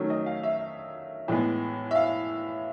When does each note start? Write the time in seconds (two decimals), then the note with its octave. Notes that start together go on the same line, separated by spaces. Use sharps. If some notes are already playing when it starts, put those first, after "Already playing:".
Already playing: D#3 F#3 A3 C#4
0.10 D#5
0.26 F5
0.43 E5
1.28 A2 E3 G#3 B3
1.91 E5
1.96 F5